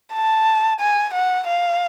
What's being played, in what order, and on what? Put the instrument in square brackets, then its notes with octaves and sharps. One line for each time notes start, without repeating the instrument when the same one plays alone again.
[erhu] A5
G#5
F#5
F5